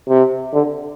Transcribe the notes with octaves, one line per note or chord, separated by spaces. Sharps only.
C3
D3